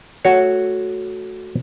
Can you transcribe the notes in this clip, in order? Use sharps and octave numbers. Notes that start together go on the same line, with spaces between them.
A3 F#4 C#5